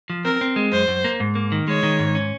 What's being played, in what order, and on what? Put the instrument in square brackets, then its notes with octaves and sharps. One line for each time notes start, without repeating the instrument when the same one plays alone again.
[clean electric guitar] F3
[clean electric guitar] C4 [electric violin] A#4
[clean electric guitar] C4
G#3
[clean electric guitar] F#2 [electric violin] C5
[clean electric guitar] F#2
A#3
G#2
A#3
D#3
[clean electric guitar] G#3 [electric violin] C#5
[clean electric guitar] D#3
G#2
C#4